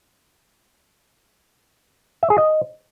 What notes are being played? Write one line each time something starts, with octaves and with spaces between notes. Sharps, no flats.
E5
G#4
D#5